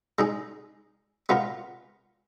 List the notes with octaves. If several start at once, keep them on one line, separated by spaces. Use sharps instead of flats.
G#3 D#4 G#4
G#3 B3 F4 A#4